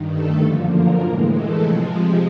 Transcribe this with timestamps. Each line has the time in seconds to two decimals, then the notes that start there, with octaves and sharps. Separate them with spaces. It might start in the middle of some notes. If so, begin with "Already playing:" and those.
Already playing: G2 D#3
0.10 A3 A4
0.41 F#2 D3 F3 A#3
0.70 A#3 A#4
1.00 A2 E3 G#3 A#3 A#4
1.30 A3 A4
1.61 C3 F3 G#3